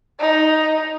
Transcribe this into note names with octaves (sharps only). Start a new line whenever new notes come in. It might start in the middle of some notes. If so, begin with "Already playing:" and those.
D#4